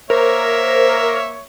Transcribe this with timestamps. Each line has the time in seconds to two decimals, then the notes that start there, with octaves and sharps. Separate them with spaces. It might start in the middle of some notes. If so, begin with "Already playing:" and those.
0.10 A#3 A#4 C5 C#5 E5